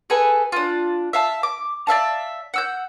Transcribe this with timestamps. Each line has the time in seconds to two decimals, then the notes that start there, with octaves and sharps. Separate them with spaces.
0.10 G#4 A4 B4 G#5
0.52 D4 F4
1.13 E5 F5 A5
1.43 D6
1.87 D5 E5 F5 A5
2.54 F#5 E6 G6